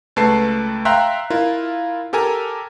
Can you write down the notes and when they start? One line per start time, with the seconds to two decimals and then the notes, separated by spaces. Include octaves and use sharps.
0.16 C#2 A3 B4 A5 C7
0.85 E5 F5 G5 A#5 C6 F#6
1.30 E4 F4 A#4
2.13 G4 A4 A#4 G#5 A#5